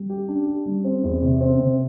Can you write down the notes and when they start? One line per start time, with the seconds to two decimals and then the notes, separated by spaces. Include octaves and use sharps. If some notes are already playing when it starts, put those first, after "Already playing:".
Already playing: G3
0.10 G4
0.28 D4
0.47 G4
0.65 G3
0.84 C4
1.03 E2
1.22 C3
1.41 C4
1.59 C3